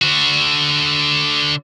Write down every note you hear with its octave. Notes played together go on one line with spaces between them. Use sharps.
D3 F#4